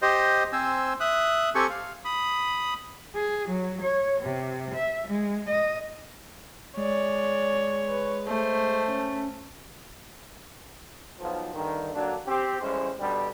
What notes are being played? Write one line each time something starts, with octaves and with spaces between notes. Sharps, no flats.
G4 C5 D#5
C4 C5 G#5 E6
E5 D#6 F#6
C4 G4 A4 G#5 C#6
F5
B5 D#6
G#4
F#3
C#5
C3
E5
G#3
D#5
G#3 C#5 D5
B4
A3 C5
C#4
B1 F3
G2 D3 D#3
D3 F#3 A#3 D4
C4 G4
A1 G3 G#3 C#4 C5
B2 D3 G3